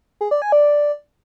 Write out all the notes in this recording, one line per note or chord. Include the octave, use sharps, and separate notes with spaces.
G#4
D5
G#5
D5